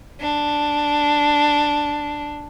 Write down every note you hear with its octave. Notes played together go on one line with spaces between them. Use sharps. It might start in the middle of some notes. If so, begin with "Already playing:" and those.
D4